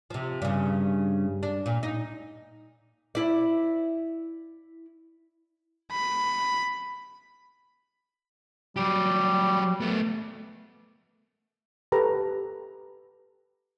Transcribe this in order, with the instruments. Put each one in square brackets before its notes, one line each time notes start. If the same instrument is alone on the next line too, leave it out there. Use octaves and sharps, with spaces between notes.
[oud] C3 F3
G2 C#3
D4
A#2
D#4
E4 D5
[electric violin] B5
[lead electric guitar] F#3 G4 [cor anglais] G3
[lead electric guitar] A3 B3
[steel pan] G4 A4 B4 A#5